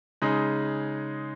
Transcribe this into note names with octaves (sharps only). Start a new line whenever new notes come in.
C#3 G#3 D#4